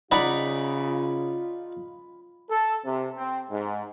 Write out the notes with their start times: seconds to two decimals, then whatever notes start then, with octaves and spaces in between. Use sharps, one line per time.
0.12 C#3 D#4 F4 D5 F#5 B5
2.50 A4
2.84 C3
3.16 C4
3.50 G#2